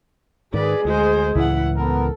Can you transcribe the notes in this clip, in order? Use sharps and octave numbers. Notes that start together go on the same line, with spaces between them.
G#2 D#3 G#4 B4 D5
D2 G#3 C5
C#2 A2 E3 E4 F#5
B3 A4 A#4